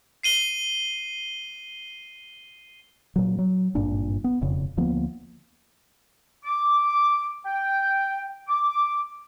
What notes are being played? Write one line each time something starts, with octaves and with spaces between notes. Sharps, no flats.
C7 D#7 G7
A#2 F#3
F#3
G#1 G2 A#2 D4
B3
E1 F2 C#3
D2 F3 A#3 B3
D6
G5
D6